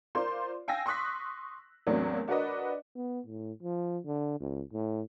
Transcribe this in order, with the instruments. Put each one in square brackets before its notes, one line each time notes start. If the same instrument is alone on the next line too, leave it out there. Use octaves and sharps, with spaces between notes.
[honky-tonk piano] F4 A#4 C5 D5 C6
F5 G5 G#5 E6 A#6
C6 C#6 D#6 F#6 B6
E2 A2 F#3 A#3 C4 D4
D4 F#4 A#4 B4 D5 D#5
[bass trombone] B3
A2
F3
D3
C#2
A2